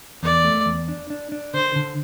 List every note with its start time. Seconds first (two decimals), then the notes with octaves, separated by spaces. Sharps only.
0.23 E2 D5
0.44 A3
0.66 E2
0.88 D4
1.10 D4
1.32 D4
1.54 D3 C5
1.76 D3